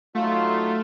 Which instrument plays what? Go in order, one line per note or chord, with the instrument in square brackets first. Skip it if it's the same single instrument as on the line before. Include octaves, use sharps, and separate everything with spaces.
[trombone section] F#3 D#4 F4 [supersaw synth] A3